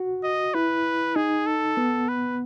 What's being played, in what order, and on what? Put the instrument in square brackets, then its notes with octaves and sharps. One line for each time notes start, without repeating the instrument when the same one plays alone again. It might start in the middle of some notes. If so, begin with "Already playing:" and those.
Already playing: [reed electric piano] F#4
[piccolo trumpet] D#5
[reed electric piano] E4 [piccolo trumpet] B4
[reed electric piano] D#4 [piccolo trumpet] G#4
[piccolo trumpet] A4
[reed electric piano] B3
[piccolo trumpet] B4